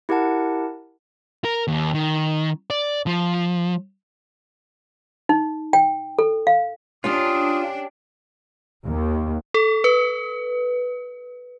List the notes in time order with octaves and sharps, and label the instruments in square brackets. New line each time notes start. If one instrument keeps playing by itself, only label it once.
[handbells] E4 G4 A#4 F#5 A5
[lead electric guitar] A#4
D#2
D#3
D5
F3
[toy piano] D#4
G5
A4
F5
[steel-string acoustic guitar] C#4 G4 [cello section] D4 [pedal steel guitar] F4 [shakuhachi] D#6
[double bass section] D#2
[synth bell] A4
B4